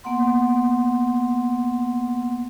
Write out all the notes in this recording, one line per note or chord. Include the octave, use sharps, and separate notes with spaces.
A#3 B3 F#5 C6